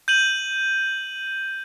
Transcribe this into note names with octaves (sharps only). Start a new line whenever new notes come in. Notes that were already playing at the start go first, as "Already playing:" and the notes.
G6 D#7 F#7